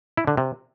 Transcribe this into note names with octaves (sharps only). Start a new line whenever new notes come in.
E4
D3
C3